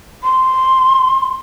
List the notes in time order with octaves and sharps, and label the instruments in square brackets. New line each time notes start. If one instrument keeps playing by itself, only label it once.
[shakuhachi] C6